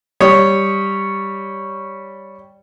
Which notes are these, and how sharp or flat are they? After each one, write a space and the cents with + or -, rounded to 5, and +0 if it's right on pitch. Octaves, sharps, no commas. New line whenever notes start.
G3 +0 C#5 +0 D#6 +0